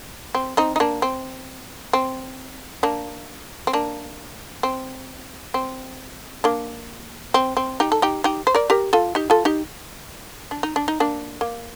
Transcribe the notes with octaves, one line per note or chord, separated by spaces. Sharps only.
C4
C4 D#4
D#4
A#3 D4
C4
C4
A#3 D4
C4
A#3 D4
C4
C4
A#3 D4
C4
C4
D#4 G4
A4
D#4 G4
D#4 G4
C5
A#4 D5
G4 A#4
F4 A4
D#4 G4
F4 A4
D#4 G4
D4
D#4
D4
D#4
A#3 D4
A#3